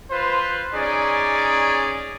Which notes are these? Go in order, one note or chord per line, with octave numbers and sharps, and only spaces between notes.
F4 B4 C5
C#4 D#4 G#4 D5